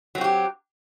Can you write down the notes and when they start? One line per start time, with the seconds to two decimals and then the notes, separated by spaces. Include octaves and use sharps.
0.15 F#3
0.18 C4
0.21 F#4
0.24 G4